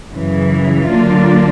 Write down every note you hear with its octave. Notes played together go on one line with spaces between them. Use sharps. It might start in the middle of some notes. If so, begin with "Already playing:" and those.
F#2 C#3 E3
D3 F#3 A#3 D4 F4